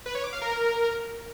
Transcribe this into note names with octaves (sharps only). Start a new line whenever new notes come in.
B4
C#5
D6
F5
A#4